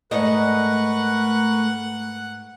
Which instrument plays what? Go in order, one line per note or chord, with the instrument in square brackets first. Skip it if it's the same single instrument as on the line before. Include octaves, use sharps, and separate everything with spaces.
[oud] G#2 D#5 [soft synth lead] A3 [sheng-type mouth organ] A#4 B4 C#6 [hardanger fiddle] F#5